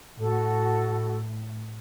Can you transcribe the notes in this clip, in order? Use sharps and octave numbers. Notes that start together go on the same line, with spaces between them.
A2 F#4 A4